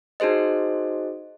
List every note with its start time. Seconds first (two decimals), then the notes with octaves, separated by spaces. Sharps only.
0.20 D#4 F#4 G#4 C5 D#5